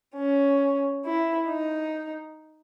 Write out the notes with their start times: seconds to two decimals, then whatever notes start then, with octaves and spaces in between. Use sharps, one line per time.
0.16 C#4
1.04 E4
1.48 D#4